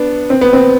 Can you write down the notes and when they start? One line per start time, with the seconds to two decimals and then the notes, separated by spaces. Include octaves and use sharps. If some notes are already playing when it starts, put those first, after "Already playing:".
Already playing: B3 D4
0.30 C4
0.41 B3
0.53 C4